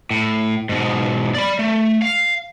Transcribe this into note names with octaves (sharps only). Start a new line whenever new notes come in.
A2
G#2 B2
D5 B5
A3
F5